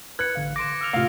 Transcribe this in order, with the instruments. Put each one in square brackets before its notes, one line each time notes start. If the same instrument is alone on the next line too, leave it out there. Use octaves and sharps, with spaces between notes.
[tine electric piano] B4 [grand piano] F#6 [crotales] G#6 C#7
[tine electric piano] A1 D3 F5
[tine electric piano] C6 D6 [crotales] A#6 D7 E7
[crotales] E6 F6 F7
[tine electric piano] A2 C3 A3 [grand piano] F4 F5